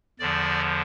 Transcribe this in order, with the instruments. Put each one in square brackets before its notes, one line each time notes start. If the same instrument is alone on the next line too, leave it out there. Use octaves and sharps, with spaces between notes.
[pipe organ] E2 D3 F3 D5